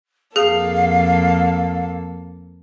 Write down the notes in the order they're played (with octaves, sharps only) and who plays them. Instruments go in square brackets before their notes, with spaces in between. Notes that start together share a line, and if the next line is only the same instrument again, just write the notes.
[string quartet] F2 A#3 A4 [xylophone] G#4 [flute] F5